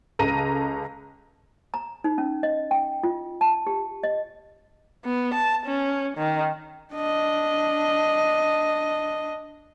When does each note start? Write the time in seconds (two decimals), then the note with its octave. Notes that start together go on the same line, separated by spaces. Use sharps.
0.19 C#2 C#3 A4 A#5 A#6 D#7
1.74 A#5
2.04 D#4
2.18 C#4
2.43 D#5
2.71 G5
3.03 F4
3.41 A5
3.67 G4
4.03 D#5
5.05 B3
5.34 A5
5.66 C#4
6.18 D#3
6.94 D4 D#5